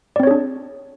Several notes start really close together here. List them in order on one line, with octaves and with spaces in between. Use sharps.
D5 C4 C#5 G#4 D4